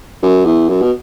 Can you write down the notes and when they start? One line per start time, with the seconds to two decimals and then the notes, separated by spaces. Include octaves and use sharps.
0.23 F#2
0.45 E2
0.69 F#2
0.82 B2